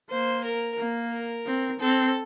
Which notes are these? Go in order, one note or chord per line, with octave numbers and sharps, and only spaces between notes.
A#3 C5
A#4
A#3
A#4
C4
C4 A4